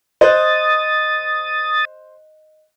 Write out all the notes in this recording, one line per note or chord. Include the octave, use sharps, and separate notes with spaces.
C5 D#5 D#6 F#6 A6